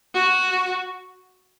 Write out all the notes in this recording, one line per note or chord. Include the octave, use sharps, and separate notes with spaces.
F#4